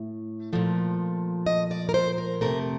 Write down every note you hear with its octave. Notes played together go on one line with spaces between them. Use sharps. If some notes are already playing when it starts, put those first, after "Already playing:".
Already playing: A2 A3
A#2 F3 A3
D#5
D5
A#4
C5
A#4
F2 C3 F3 A3 A#4